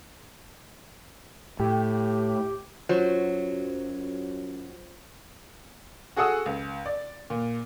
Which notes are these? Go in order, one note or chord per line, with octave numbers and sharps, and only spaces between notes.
A2 G4
F#2 F#3 F4 C5 C#5
F#4 G#4 A4 F#5 D#6 E6
C#2
D5
A#2